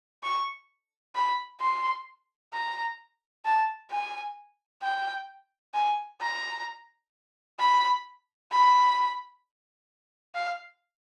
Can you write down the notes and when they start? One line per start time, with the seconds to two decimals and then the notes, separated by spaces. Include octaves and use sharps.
0.23 C#6
1.15 B5
1.60 C6
2.53 A#5
3.45 A5
3.91 G#5
4.82 G5
5.74 G#5
6.21 A#5
7.59 B5
8.51 B5
10.35 F5